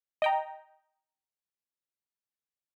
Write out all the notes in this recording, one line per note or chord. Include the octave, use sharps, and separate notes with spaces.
D#5 G5 A#5